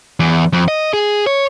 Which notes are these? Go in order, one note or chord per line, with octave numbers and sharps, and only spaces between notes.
E2
F2
D#5
G#4
C#5